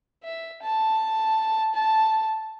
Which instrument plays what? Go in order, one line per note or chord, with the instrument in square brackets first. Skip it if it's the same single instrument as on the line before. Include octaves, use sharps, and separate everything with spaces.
[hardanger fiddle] E5
A5
A5